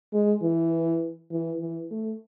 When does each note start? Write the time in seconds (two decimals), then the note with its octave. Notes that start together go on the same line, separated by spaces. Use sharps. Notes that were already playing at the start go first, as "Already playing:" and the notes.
0.13 G#3
0.42 E3
1.31 E3
1.60 E3
1.91 A3